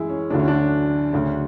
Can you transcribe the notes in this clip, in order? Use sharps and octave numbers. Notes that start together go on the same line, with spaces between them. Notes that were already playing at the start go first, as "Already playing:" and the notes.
Already playing: F#2 E3 G#3 E4 G#4
C#4
D2 D3 F#3 D4
C#4
D4
D2 C#3 F#3